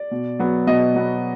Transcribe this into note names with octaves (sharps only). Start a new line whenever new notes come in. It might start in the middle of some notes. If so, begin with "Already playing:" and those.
Already playing: D5
B2
F#3 B3
B2 D#5
F#3 B3